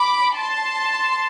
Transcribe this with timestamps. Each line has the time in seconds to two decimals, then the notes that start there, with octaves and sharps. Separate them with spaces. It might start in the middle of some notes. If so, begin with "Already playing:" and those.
Already playing: B5 D6
0.35 A5 C6